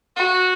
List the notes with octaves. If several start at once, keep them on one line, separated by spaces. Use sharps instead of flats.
F#4